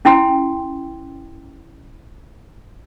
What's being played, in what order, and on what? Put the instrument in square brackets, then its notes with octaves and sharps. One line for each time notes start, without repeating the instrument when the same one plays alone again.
[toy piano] C#4 E4 G5 G#5 C6